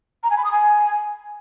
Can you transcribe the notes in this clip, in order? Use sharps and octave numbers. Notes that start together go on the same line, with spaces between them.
A#5
G#5
B5
D#6
G#5